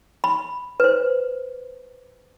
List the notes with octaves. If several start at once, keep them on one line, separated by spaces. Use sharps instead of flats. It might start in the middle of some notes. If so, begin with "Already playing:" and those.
B5
B4 C5